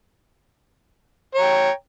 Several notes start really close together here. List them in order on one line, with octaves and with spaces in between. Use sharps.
C#5 A#5 G5